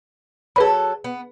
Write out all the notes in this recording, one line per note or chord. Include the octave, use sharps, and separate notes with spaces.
F#3 G#4 A4 B4 B5
B3